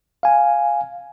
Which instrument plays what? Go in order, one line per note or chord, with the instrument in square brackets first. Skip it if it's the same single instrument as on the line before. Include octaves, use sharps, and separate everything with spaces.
[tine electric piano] F5 G#5